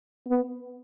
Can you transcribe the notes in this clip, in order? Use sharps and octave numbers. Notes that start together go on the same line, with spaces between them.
B3